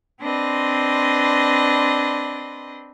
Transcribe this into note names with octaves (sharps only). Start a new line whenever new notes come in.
C4 D4 B4 D#5 C6